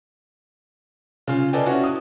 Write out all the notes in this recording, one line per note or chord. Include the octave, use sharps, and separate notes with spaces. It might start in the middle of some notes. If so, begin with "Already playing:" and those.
C#3 F4
A4 B4 D5 D#5 G5 G#5
C#4 E4 F#4
D#6